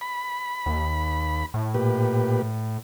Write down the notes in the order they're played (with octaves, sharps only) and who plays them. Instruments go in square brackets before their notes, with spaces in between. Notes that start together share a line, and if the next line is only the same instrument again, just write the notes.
[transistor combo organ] B5
[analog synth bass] D#2
A2
[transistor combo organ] A#2 G4 B4